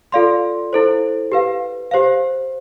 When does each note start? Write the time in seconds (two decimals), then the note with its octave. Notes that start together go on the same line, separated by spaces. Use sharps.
0.12 F4 A4 D5 F5 C6
0.73 E4 A4 C5
1.32 G4 B4 F5
1.91 G4 C5 F5